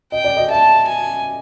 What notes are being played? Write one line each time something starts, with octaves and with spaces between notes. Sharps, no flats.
D#5 G5
D5
D#5
E5 A5
G#5